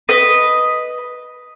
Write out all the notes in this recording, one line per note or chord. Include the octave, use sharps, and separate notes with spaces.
B4 D#5